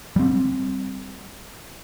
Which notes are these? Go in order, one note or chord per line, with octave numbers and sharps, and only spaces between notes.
G3 C4